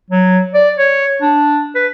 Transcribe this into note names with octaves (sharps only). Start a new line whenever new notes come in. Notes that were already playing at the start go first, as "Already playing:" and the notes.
F#3
D5
C#5
D4
B4